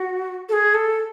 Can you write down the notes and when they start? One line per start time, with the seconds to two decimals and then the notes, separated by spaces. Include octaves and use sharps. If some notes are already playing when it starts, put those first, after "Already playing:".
Already playing: F#4
0.49 A4
0.53 G#4
0.74 A4